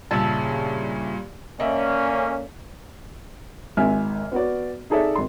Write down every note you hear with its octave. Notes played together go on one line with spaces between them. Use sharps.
G2 A#2 C#3 E5 A5
D3 A#3 C#4 D#5 E5
G#1 G#2 E5 G#5 F6
B3 F#4 D5
D#4 G#4 A4 D5 E5
G#1 C6